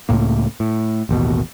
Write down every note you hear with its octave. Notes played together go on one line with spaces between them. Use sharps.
C#2 A2 A#3
A2
A1 D#2 B2